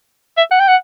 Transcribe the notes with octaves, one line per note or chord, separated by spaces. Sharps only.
E5
F#5
G5
F#5